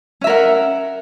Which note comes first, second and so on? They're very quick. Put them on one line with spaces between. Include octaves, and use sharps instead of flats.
C#4 E5 A#4 F#5